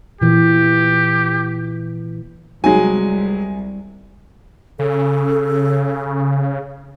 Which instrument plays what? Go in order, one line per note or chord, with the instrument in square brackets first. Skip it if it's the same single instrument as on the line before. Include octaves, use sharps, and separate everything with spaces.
[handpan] A#2 E3 [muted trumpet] G4
[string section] C2 [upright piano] F#3 G#3 [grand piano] G#5
[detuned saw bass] C#3 [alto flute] A4